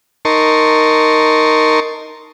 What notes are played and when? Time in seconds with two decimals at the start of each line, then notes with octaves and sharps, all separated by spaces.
0.25 D#4 A#4 A5 C6 C#6